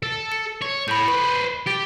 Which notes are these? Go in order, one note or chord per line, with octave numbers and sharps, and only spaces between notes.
A4
C#7
C#5
A2 B5 G6
B4 C5 B5
G4 A6